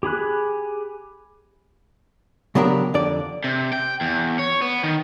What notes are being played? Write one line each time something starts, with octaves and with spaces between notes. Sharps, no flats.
G4 G#4 B5 F#6
C#3 F#3 B3 D4 G4 A#4
F2 D3 D5
C3
G5
E2
C#5
B3
D#3